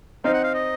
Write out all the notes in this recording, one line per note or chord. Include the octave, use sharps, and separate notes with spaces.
C4 D#4 F5
F#5
F5
D#5